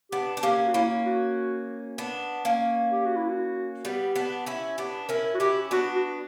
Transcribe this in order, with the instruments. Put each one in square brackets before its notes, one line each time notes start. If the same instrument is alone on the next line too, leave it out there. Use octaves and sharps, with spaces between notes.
[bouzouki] B3 D4 [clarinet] G4
[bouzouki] D4
[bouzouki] A#3 C#4 [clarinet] G4
[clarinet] F#4
[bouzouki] A#3 C#4 [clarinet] E4
[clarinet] F#4
[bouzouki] B3 D4
A#3 C#4
[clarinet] G4
F#4
E4
F#4
[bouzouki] G3 B3
B3 D4
C#4 E4
[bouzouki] B3 D4 [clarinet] G4
[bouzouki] C#4 E4 [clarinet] A#4
[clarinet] F#4
[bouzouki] C#4 E4 [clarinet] G4
[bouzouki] B3 D4 [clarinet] F#4
[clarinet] F#4